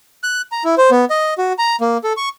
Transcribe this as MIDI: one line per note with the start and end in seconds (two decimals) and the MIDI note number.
0.23 0.42 90
0.52 0.63 82
0.65 0.75 64
0.78 0.90 72
0.91 1.05 59
1.10 1.34 75
1.38 1.53 66
1.59 1.76 82
1.81 1.97 58
2.04 2.13 69
2.17 2.29 85